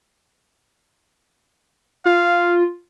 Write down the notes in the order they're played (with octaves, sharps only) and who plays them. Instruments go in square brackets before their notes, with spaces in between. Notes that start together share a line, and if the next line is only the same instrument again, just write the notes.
[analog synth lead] F4 [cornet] F5